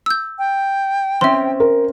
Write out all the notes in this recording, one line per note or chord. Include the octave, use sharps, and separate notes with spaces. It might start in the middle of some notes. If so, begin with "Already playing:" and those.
E6 G6
G5
C4 C#4 E5 C6
A#4